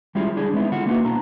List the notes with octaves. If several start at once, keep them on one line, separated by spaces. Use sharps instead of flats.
G3 G#3 C#4 E4 F4 G4
D3 D4 G#4
G#3 B3 C4 D#4 E4
D3 F4 F#5
A#3 D#4 E4 F#4 A#4 B4
B2 D4 A#5